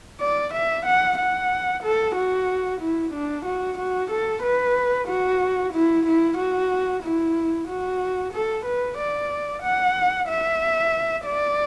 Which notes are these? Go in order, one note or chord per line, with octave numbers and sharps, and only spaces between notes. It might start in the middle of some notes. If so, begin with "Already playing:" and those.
D5
E5
F#5
F#5
A4
F#4
E4
D4
F#4
F#4
A4
B4
F#4
E4
E4
F#4
E4
F#4
A4
B4
D5
F#5
E5
D5